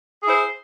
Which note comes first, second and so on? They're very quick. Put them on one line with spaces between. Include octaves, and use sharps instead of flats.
G#4 E4 C5